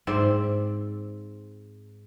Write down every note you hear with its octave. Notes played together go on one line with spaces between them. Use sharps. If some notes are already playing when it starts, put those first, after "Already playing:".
G#2 C4 D5 E5